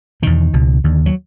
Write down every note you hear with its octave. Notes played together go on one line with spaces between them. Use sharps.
E2 B2 D#3
C#2 B2
D#2 D3
F#3